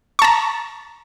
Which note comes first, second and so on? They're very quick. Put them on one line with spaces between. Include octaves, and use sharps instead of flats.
C#6 A5 A#5